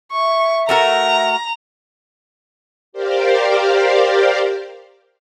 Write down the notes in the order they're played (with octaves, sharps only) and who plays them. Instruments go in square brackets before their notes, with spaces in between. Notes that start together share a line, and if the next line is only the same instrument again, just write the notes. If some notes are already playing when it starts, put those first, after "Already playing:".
[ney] E5 [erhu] C#6
[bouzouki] A3 F#4 A#4 [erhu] A#5
[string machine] G4 A#4 C5 D5 F5